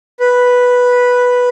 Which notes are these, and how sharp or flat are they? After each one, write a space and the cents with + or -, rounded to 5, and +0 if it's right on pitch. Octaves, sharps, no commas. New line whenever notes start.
B4 -5